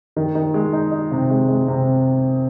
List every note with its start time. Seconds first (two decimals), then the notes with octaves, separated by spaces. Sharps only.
0.16 D#3
0.35 D#3
0.54 G#3
0.73 D#4
0.91 D#4
1.11 C3
1.30 G#3
1.48 G#3
1.68 C3